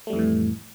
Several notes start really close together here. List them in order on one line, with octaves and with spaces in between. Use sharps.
A3 G3 F2 E3 A2